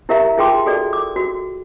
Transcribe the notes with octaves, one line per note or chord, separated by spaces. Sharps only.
E4 G4 A#4 E5 F5 A#5
D#4 F4 G#4 G5 C6 D6
F#4 G#4 A4 D5
D6
F#4